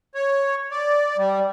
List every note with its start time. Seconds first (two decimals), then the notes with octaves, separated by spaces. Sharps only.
0.15 C#5
0.71 D5
1.18 G3